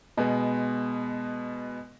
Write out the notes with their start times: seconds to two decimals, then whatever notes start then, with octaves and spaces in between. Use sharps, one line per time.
0.17 B2 G#3 B3